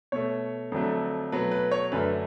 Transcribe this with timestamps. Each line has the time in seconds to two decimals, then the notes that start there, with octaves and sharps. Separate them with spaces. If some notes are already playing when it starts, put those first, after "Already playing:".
0.12 B2 A3 C#5
0.72 F2 D3 F#3 A3
1.32 B2 F#3 A3 B4
1.52 B4
1.71 C#5
1.92 F#2 D3 F#3 A3 B4